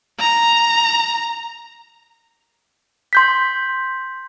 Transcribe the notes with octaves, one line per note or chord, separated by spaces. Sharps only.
A#5
C6 G6 B6